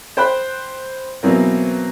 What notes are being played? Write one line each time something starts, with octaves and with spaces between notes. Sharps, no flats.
C5 G5 B5 F#6
B2 E3 F#3 A#3 C4